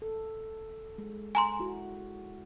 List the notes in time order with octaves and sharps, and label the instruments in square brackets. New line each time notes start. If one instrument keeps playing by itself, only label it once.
[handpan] A4
G#3
[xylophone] G#5 A#5 C6
[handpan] E4 F#4